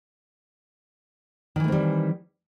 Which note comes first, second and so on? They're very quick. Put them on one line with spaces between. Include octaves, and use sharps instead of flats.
D#3 E3 A3 C4 G3